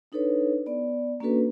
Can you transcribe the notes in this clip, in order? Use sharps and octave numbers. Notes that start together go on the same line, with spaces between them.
D4 D#4 A4 B4 C#5
B3 D5
A#3 C#4 D4 F#4 A4 B4